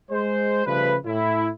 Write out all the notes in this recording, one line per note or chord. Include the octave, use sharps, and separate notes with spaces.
G#3 C5
C#3 F3 G3 A3 B4
A2 E4